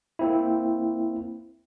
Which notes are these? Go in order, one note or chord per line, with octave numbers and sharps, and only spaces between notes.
A#3 C4 E4